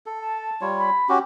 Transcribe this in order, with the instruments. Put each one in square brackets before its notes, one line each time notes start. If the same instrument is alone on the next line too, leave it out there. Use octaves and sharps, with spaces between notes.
[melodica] A4
[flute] A5
[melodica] G3 F4 C#5
[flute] B5
[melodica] C#4 F#4 G4